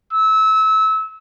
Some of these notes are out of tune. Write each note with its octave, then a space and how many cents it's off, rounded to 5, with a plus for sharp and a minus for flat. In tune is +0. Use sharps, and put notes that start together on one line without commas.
E6 -25